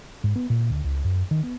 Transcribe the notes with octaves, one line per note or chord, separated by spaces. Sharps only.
G#2
B3
A#2
D2
C#2
F#2
D#3
B3